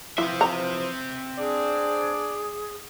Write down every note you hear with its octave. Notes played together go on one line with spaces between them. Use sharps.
E3 F3 C4 E4 E5
A#5
D4 G#4 D5